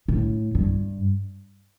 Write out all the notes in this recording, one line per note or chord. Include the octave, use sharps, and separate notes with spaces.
A2
G2